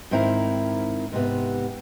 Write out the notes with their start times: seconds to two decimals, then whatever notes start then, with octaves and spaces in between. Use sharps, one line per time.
0.11 G#2 D#3 C4 E4 A#4 A#5
1.12 G#2 C3 B3